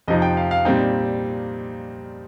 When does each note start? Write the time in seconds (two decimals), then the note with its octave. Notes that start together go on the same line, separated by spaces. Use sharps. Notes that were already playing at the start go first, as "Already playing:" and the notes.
0.08 F2 C3 F3 D#4 D#5
0.22 G5
0.37 F5
0.51 F5
0.65 A#2 G3 C4 D#4 G5